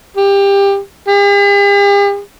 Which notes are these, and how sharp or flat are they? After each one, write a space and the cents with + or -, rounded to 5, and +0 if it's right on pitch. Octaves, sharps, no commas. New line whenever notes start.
G4 +20
G4 +45